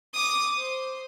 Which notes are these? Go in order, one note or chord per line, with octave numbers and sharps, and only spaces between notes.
D6 D#6
C5